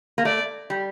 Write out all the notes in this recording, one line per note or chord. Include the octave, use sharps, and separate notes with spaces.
A#3
A3 D5
G3